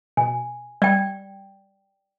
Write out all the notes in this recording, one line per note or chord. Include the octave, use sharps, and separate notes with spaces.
B2 G#5
G3 D5 G5